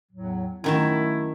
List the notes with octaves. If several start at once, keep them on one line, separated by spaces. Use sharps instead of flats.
E2 A2 F#3
F#2 D#3 A3 E4 A5